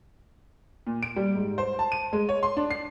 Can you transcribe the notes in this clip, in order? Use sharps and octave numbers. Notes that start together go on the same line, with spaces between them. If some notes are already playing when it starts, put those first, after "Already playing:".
A#2
D7
G3
G#2
C5
A5
D#7
G#3
C#5
C6
D4
C7